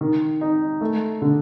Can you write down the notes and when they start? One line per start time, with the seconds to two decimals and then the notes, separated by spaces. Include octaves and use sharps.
0.01 D#3
0.41 D#4
0.81 A3
1.22 D3